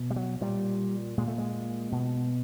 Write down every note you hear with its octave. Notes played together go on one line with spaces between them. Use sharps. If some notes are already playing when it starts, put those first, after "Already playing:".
Already playing: B2
G3
F#3
A#2 G3
A#2 G#3
A3
G#3
B2